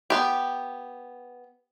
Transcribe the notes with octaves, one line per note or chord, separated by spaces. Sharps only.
B3 G4